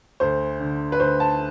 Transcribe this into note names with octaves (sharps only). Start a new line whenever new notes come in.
D2 C5
D3
B4
D2 C5
A5